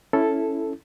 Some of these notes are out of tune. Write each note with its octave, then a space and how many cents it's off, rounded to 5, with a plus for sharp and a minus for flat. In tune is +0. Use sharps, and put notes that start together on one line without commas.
C#4 +0 E4 +0 A4 +0